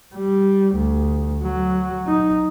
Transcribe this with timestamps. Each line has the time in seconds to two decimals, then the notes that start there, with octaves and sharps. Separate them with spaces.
0.15 G3
0.75 D2
1.43 F#3
2.06 D#4